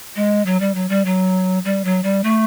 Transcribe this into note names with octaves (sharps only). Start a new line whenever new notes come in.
G#3
F#3
G3
F#3
G3
F#3
G3
F#3
G3
A3